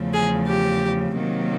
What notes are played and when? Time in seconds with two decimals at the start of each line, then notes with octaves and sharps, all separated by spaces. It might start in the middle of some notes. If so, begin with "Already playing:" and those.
Already playing: E2 C#3 F3 A3
0.13 G#4
0.48 G4
1.15 C3 D#3 F#3 A#3